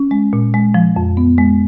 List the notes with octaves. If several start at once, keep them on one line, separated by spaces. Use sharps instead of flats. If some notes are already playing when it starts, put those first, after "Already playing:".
Already playing: C#4
G#3
A#2
G#3
F3
F2
B3
G#3